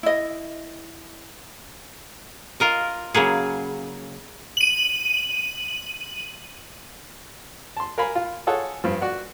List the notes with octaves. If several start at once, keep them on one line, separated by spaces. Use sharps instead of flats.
E4 D#5
F4 A#4 D#5
C#3 F#3 A#3 G#4
D#7 F#7
A5 C6
A#4 F5 G#5 B5
F4
F4 G#4 A4 C#5 F#5
G2 F3
F#4 D5 F#5